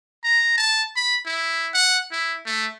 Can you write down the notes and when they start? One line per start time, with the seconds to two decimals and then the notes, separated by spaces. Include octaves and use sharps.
0.24 A#5
0.57 A5
0.96 B5
1.26 E4
1.74 F#5
2.12 E4
2.46 A3